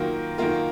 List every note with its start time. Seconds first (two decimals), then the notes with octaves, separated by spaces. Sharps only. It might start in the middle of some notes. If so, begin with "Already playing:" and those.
Already playing: D#3 F#3 A#3 F4 A#4
0.38 D#3 F#3 A#3 F4 A#4